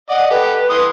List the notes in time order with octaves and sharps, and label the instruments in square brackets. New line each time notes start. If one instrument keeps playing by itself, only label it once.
[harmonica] D5 D#5 [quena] F#5
[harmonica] G4 A4 [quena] B4
[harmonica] E3 C6 D#6